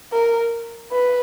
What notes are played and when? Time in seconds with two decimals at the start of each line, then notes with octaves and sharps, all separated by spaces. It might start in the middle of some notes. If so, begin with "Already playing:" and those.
0.13 A#4
0.92 B4